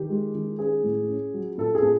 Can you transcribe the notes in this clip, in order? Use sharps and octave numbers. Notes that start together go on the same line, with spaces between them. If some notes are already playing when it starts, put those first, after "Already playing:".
Already playing: D#3 G4
G#3
D#3
C#4 G#4
A2
C#4
F#3
A#2 A4
G#4
A#2